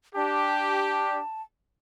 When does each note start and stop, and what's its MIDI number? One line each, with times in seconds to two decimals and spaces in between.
0.15 1.18 62
0.15 1.18 67
0.15 1.42 81